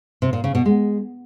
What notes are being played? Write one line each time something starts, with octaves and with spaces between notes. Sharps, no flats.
C3
A#2
C#3
B2
G#3